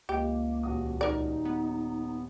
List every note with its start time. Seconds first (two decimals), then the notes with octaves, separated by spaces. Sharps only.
0.09 C#2 A#3 G4 D#5
0.63 D#1 F#4 D#6
1.01 D#4 A#4 D5
1.45 B3